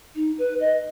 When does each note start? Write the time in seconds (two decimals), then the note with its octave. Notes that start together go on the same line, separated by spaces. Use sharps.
0.15 D#4
0.38 B4
0.60 D#5